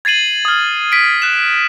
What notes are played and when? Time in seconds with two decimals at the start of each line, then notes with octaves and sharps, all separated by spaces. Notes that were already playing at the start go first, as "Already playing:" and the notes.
0.05 G#6 A6 C7 D#7 F#7
0.45 D#6 F6
0.92 B6 D7
1.22 F#6 E7